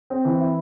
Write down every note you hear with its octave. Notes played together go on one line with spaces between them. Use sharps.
C4
E3
E4